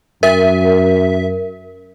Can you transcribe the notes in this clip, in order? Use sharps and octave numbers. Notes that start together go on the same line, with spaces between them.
F#2 A#4 E5